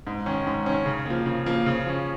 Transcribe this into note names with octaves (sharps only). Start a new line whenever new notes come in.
G#2
D#3 C#4
G#2
D#3 C#4
C#3
F3 A#3
C#3
F3 A#3
C#3
F3 C#4